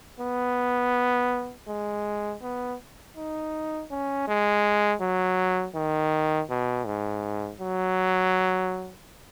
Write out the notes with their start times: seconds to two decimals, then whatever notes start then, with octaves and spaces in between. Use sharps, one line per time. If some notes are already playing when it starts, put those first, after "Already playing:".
0.20 B3
1.68 G#3
2.42 B3
3.17 D#4
3.91 C#4
4.28 G#3
5.01 F#3
5.76 D#3
6.50 B2
6.86 G#2
7.60 F#3